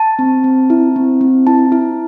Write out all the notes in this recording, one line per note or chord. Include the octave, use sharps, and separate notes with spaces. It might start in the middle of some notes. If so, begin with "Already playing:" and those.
Already playing: A5
C4
C4
E4
C4
C4
E4 A5
E4